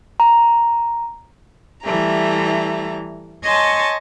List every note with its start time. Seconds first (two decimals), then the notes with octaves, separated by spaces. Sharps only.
0.20 A#5
1.83 E3 G3 A3 A#5
3.44 C#5 D#5 G#5 A5 C6 C#6